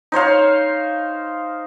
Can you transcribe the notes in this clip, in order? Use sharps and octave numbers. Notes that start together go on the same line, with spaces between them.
D#4 C5 C#5 F5